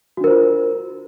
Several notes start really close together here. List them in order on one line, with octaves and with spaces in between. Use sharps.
F#4 D4 A#4 C5 F4